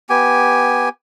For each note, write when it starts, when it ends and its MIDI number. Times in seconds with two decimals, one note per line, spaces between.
0.10 0.89 59
0.10 0.89 67
0.10 0.89 80